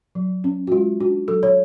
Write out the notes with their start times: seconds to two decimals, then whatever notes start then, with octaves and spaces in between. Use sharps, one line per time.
0.15 F#3
0.44 C#4
0.67 F#4
0.72 G#3 F4
1.00 D4 F#4
1.28 F#3 A4
1.43 C#5